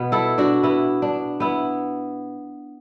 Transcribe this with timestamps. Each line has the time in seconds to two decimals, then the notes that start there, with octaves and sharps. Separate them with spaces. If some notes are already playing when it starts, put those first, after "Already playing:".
Already playing: B2 B3
0.12 E4 A4
0.38 D4 F#4
0.63 B3 E4
1.02 D4
1.40 B3 E4